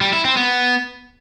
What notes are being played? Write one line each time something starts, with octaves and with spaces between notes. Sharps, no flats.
G3
E4
C4
B3